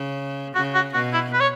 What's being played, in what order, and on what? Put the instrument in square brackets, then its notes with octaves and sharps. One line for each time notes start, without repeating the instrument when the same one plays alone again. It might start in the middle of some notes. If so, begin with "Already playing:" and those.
Already playing: [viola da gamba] C#3
[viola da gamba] C#3 [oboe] F#4
[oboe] F#4
[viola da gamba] B2 [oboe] F#4
[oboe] E4
B4
C#5